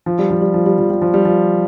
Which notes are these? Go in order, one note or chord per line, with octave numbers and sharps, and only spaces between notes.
F3
G3
F3
G3
F3
G3
F3
G3
F3
G3
F3